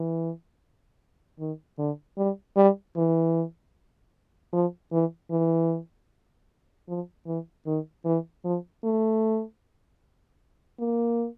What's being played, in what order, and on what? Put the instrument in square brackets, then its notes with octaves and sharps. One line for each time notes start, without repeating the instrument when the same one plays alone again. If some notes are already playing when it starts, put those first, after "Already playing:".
Already playing: [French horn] E3
D#3
D3
G3
G3
E3
F3
E3
E3
F3
E3
D#3
E3
F3
A3
A#3